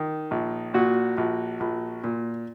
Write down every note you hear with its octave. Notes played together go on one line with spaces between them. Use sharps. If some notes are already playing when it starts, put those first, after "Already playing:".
Already playing: D#3
A#1
A#2 F#4
A#1
A#1
A#2